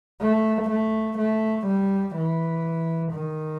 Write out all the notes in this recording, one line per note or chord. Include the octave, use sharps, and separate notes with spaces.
A3
A3
A3
G3
E3
D#3